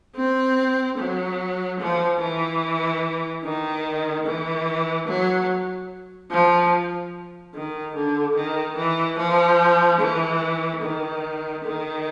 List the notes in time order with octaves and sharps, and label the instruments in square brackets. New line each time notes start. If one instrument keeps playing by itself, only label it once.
[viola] C4
F#3
F3
E3
D#3
E3
F#3
F3
D#3
D3
D#3
E3
F3
E3
D#3
D#3